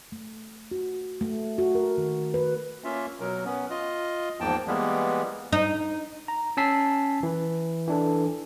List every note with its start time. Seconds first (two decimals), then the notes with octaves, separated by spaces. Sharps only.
0.12 A3
0.71 F#4
1.21 A3
1.58 F#4
1.75 A#4
1.98 D#3
2.34 B4
2.84 A#3 C#4 F4 E5
3.20 B2 F#3 A#4
3.45 B3 C#4
3.70 F4 D#5
4.41 E2 G#2 F3 A#3 G5 A5
4.67 E3 G3 G#3 A#3 B3
5.53 D#4
6.28 A#5
6.57 C#4 G#5 A5 E6 B6 C7
7.23 E3 B4
7.88 E3 D4 A4